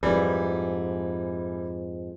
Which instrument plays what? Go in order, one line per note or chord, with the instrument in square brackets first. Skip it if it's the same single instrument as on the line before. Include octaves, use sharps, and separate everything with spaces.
[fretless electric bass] F2 G#2 [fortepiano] E3 G3